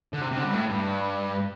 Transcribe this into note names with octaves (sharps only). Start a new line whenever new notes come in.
D3
C3
C3
D3
G2
A2
G2